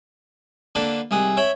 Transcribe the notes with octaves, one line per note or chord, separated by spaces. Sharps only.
D3 A#3 D4 A4 B4
C2 D#3 G#4 F#5
C#5 E5 G5 B5